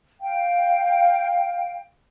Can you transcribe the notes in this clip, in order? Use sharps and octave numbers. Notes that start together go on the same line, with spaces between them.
F5 G5